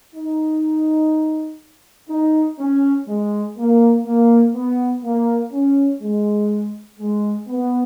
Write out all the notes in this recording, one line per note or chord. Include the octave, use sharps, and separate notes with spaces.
D#4
D#4
C#4
G#3
A#3
A#3
B3
A#3
C#4
G#3
G#3
B3